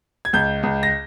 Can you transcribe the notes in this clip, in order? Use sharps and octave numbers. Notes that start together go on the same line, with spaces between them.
G#6
C#2 G6
C#2
A#6